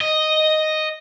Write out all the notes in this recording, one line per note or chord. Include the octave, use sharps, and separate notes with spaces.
D#5